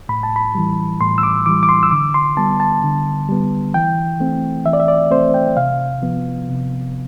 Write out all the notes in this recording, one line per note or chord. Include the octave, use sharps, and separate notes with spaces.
A2 B5
A5
B5
E3 G3
A2 C6
E6
D6
E3 G3 D6
D6
C6
E6
D3 D6
C6
G3 B3 A5
A5
D3
G3 B3
E3 G5
A3 C4
E3 E5
D5
E5
D5
A3 C4 C5
G5
C3 F5
F3 B3
C3